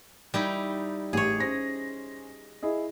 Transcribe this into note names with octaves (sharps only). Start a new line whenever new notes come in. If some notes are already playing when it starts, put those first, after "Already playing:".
G3 D#4 E4
A1 G4 G#4 C#5
C#4 C5 A#6
E4 G#4 D#5